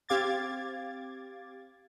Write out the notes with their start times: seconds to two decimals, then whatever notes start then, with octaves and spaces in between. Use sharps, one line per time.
0.09 C4 G4 F5 D6 G#6 A6